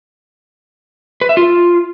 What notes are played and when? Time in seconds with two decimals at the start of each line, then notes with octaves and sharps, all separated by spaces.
1.21 B4
1.29 E5
1.37 F4